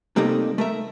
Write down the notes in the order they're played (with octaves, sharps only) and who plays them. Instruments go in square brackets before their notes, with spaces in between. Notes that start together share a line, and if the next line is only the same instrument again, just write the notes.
[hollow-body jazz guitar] C3 G3 A3 A#3 D#4
A3 A#4 E5